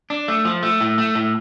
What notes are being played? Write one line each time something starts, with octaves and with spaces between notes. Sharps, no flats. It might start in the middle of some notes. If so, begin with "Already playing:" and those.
D4
A3
F3
A3
A2
A3
A2